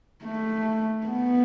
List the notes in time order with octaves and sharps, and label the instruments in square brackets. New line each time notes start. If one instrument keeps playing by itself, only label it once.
[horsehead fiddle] A3
B3